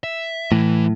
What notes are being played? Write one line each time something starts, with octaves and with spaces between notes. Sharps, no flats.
E5
A2 E3